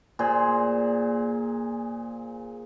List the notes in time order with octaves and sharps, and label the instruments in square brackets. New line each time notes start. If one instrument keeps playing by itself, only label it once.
[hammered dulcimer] A#2 G#4 C5